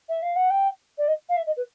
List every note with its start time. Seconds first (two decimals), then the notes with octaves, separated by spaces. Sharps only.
0.09 E5
0.22 F5
0.36 F#5
0.50 G5
0.98 D5
1.08 D#5
1.29 F5
1.37 E5
1.46 D#5
1.57 B4